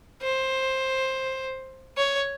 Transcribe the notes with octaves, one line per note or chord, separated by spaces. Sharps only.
C5
C#5